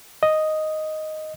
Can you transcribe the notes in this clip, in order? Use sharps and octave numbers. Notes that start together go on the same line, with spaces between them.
D#5